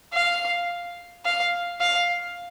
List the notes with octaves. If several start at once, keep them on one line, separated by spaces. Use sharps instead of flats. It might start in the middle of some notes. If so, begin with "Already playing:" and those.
F5
F5
F5